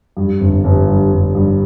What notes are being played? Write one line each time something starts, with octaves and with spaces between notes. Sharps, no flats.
G2
G1
G1
G2
G1
G2